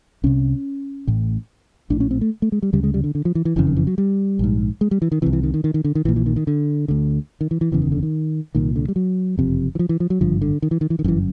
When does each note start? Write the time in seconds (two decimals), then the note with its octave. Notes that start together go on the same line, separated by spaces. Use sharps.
0.24 C2 C3 C#4
1.07 A1 A2
1.90 A#1 A2 D4
2.00 C#4
2.11 C4
2.21 A3
2.42 A3
2.52 G#3
2.62 G3
2.73 D2 C#3 G3
2.83 G#3
2.94 G3
3.04 D3
3.15 D3
3.25 F3
3.35 E3
3.45 E3
3.56 F#1 F2 C#3 E3
3.67 D#3
3.76 E3
3.87 F#3
3.98 G3
4.39 A#1 G#2
4.81 G#3
4.91 G3
5.02 E3
5.12 D#3
5.22 C2 C3 E3
5.33 E3
5.43 D#3
5.54 D#3
5.64 D#3
5.74 D#3
5.84 D3
5.95 D#3
6.05 A#1 E3
6.08 A#2
6.16 E3
6.26 D#3
6.36 D#3
6.47 D3
6.88 D2 D3
7.41 D#3
7.51 E3
7.61 E3
7.72 F#1 E2 C#3 E3
7.82 D#3
7.92 D3
8.03 D#3
8.55 C2 A#2 D#3
8.76 D3
8.88 G3
8.96 F#3
9.37 F#1 F2 C3
9.75 E3
9.79 F3
9.89 E3
10.00 F3
10.10 F#3
10.21 G#1 G2 D3 F3
10.42 D3
10.62 D#3
10.71 E3
10.81 D#3
10.90 E3
10.99 D#3
11.04 G1 F#2 D3
11.08 E3